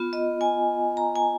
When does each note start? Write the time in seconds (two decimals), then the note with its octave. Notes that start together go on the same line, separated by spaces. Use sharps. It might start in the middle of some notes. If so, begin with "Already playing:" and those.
Already playing: B3 F4
0.13 D#5
0.41 G#5
0.97 A#5
1.16 G#5